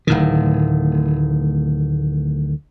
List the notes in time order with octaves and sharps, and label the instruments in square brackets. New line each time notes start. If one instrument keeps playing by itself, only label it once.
[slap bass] D1 A2 D#3